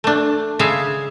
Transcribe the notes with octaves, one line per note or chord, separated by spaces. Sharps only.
A3 D4
C#3 G#3 G#4 E5 F5